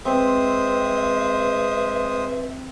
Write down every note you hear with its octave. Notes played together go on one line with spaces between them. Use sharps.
G#3 C4 B4 C5 E5 D#6